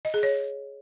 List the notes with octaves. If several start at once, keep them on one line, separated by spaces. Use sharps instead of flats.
D#5
G#4
C#5